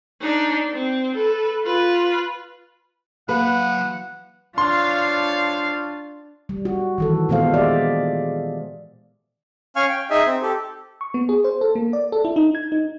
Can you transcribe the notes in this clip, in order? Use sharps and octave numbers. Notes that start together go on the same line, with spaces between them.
D4 D#4
C4
A4 B4
F4 B4
F#3 A#3 B4 F5 F#5
D4 F4 C5 C#5 F5 C6
G3
F#4
D#3 E3 A4
A#2 G#3 B3 A4 C5 F5
G4 G#4 D5 E5
C#4 F5 G#5 C#6 F6
G5
D#4 G#4 D#5 E5 G#5
C4
G4 A4
C#6
B3
G#4
C5
A4
A#3
D5
A4
E4
D#4
G#6
D#4